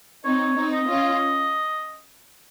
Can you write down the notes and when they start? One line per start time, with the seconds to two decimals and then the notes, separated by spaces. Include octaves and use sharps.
0.25 C4 D#4 C#5
0.56 C4 D#4
0.73 D#5
0.88 C#4 F4